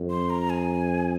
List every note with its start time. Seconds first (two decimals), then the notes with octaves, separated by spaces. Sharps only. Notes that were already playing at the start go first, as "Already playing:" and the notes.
Already playing: F2
0.10 C6
0.30 A#5
0.50 G#5